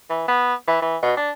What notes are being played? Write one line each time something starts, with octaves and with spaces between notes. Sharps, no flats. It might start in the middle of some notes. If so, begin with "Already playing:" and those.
E3
B3
E3
E3
B2
D4